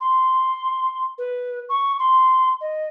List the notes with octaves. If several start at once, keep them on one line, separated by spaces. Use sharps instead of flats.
C6
B4
C#6
C6
D#5